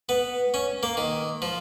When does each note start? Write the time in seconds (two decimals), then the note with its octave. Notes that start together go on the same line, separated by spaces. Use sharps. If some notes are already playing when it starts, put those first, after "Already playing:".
0.09 B3
0.54 C#4
0.83 A#3
0.97 D#3
1.42 F3